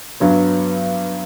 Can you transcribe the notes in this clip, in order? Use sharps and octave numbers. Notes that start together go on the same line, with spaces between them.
G2 F#3 B3